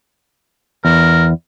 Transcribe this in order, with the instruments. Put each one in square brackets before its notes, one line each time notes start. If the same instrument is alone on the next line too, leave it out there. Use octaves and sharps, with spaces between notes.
[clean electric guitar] E2 [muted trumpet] A#4